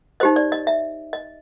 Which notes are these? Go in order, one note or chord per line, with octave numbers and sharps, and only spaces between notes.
D#4 G4 C5 D#5
D5
D#5
E5
D#5